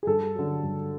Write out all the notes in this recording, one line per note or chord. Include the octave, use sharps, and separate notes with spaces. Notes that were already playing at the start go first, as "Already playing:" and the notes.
G#4
G2 A4
D3 F#3
G2